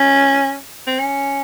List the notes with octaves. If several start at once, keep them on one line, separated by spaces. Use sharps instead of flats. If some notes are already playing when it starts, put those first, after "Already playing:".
Already playing: C#4
C4
C#4